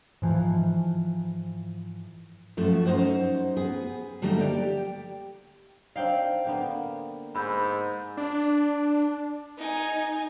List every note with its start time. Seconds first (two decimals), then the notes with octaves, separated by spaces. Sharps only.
0.22 G#2 E3 F3
2.57 F#2 F3 A3
2.86 F#2 D#4 C5 F#5
3.57 B3 G#4
4.22 D3 G3 A3 A#3 D#4
4.39 G4 D5
5.96 C4 D4 D#4 F5 G5
6.45 D3 A#3 B3
7.35 G#2 B5 E6 G6
8.17 D4
9.58 D#4 G#5